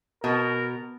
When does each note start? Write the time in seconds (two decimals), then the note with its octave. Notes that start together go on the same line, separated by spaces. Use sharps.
0.24 B2 A#4